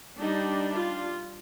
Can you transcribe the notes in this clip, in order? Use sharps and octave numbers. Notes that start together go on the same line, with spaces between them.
G3 D4 D#4
F4